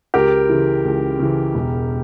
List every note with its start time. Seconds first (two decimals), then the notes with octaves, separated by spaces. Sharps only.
0.14 C#2 G4 A#4
0.49 C#3 E3
0.85 C#2
1.19 C#3 E3
1.54 E1